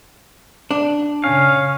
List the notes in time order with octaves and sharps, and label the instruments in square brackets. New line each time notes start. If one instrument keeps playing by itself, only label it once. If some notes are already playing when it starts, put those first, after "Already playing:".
[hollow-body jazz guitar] D4
[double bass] C#3 [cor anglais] C#4 [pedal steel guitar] F5